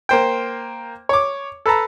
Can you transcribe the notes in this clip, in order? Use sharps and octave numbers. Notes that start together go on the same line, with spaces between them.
A#3 C5 G5
C#5 D6
A4 B4 A5 A#5